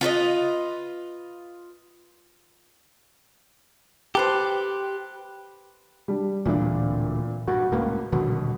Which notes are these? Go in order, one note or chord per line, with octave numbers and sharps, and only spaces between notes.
F4 B4 C5 D#5
G4 A4 B4 C5
G3 D4
D1 A#2 E3 D4
G2 F#4
C#2 A2 A#3 B4
D#1 B2 D3 F#3